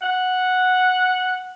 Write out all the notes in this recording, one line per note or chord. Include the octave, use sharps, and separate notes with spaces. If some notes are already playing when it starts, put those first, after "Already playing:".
F#5